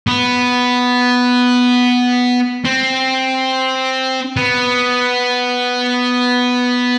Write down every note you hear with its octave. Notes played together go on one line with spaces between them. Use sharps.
B3
C4
B3